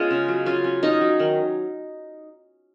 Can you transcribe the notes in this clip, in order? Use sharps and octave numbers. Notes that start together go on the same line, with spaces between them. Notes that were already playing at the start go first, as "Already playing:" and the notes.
Already playing: G#3 B3 C#4 F4
C#3
F#3
C#4 F4
C#4
C#4 D#4
F#3
D#3